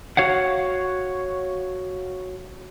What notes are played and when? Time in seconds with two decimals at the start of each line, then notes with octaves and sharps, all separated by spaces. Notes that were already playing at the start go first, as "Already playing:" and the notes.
0.17 F#4 C#5 F5 F#5